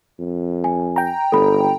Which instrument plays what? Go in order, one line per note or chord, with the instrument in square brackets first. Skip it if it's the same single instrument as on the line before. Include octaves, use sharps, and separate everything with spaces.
[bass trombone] F2
[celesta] G#5
[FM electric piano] G5 A#5
[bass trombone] G1 [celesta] A4 B5